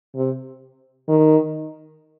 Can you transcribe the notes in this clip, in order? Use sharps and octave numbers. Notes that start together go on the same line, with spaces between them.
C3
D#3